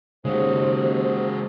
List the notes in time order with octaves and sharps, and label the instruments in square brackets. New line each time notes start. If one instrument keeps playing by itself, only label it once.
[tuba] D#2 [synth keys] C#3 [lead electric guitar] G#3 F#4 [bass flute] C5